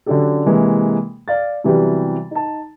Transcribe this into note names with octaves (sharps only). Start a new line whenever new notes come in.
D3 F#3 C#4 D4 G4 A4
C3 E3 G#3 A#3
D5 F5 A6
C3 E3 F#3 G3 B3
D#4 A5